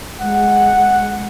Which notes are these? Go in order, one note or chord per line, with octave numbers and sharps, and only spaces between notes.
G#3 F#5